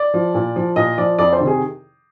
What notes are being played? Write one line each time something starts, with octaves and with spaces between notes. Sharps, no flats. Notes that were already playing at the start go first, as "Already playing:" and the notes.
Already playing: D5
F3
A#2
F3
A#2 D#5
F3 D5
F2 D5
C5
C3 D#3
G#4